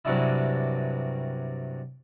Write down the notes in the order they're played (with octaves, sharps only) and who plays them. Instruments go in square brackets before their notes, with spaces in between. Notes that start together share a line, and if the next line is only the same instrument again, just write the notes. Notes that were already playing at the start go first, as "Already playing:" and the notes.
[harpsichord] G2 C3 F#3 C#4 D4 E4